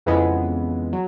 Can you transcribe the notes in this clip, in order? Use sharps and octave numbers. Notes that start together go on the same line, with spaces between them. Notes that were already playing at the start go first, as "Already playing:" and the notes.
F2 C#3 E3 G#3 B3
F#3